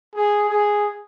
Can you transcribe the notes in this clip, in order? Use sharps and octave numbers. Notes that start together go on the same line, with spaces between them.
G#4
G#4